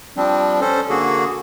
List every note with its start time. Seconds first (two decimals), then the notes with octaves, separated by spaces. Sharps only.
0.17 F3 G3 C4 D4
0.61 C#4 A4 C5
0.90 D3 A#3 F#4 G#4